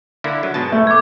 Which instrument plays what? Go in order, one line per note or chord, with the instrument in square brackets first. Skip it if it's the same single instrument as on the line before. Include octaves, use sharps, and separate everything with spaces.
[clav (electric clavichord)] D3 A#3 E4
F#3
G#2 B2 A5
[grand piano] A3
[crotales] D6 G#6